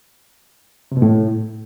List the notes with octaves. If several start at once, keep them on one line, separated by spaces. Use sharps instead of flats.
C3
B2
A2